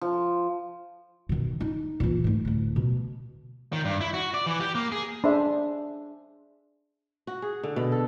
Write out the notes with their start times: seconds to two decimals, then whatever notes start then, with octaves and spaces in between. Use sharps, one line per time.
0.01 F3
1.29 B2 D#3
1.60 D#4
2.00 A#2 E3
2.24 G#2 A3
2.45 D2 A2
2.76 B2
3.73 D#3
3.85 G2
4.01 E4
4.14 F#4
4.34 D5
4.46 E3
4.60 G4
4.75 A#3
4.92 G#4
5.24 D4 G#4 C5 E5
7.27 F#4
7.42 G#4
7.63 D3
7.76 B2
7.92 A4